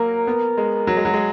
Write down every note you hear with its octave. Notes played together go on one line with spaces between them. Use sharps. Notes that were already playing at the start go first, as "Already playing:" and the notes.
Already playing: F#3 A#3 A#4
B3
G#3
F#3
G#3
F#3
G#3